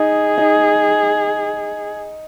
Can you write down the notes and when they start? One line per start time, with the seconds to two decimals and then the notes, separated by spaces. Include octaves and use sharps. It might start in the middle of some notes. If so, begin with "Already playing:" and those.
Already playing: D#4 G#4
0.38 D#4